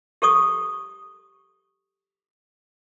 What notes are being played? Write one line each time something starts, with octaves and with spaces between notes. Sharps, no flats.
G4 A4 C#6 D#6